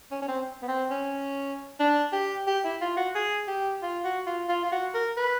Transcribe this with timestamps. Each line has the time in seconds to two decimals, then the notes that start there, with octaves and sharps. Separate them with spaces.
0.11 C#4
0.22 C#4
0.28 C4
0.62 B3
0.68 C4
0.91 C#4
1.80 D4
2.13 G4
2.47 G4
2.65 E4
2.81 F4
2.97 F#4
3.15 G#4
3.48 G4
3.82 F4
4.05 F#4
4.27 F4
4.49 F4
4.64 F4
4.72 F#4
4.94 A#4
5.17 B4